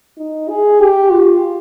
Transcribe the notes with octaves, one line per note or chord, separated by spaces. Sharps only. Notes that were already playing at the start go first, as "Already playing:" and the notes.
D#4
G#4
G4
F4